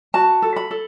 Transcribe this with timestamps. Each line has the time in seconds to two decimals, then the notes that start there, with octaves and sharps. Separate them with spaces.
0.14 F#4 A5
0.42 A4
0.56 B5
0.71 A4